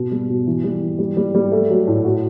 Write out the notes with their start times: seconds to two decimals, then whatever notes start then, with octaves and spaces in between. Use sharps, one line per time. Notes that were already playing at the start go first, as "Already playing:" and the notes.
Already playing: B2
0.11 G3
0.29 B2
0.46 E3
0.64 G3
0.81 E3
0.99 G3
1.17 G3
1.34 G3
1.52 A3
1.70 F#3
1.87 A2
2.04 F#4